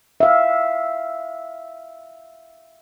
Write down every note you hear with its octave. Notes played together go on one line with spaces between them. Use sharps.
E5 F5